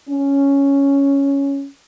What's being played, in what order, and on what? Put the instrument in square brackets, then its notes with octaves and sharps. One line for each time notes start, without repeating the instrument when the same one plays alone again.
[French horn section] C#4